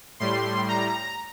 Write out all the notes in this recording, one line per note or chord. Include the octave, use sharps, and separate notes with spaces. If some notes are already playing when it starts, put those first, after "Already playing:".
A2 G3 C6
A#5